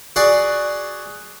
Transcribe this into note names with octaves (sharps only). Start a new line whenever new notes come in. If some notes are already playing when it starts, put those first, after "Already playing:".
F#4 G#4 D5 G#5